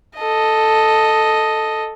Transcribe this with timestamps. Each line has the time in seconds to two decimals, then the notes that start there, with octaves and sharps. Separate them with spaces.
0.18 A4 D#5